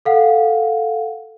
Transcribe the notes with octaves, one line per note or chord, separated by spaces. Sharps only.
A4 F5 F#5